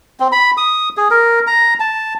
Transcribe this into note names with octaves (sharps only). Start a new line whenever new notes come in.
C4
B5
D#6
G#4
A#4
A#5
A5